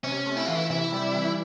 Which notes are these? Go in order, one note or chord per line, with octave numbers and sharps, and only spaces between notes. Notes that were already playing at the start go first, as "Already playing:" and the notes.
C3 C#4
A3
E4
E3 F4
E4
C3 E4
G3
E3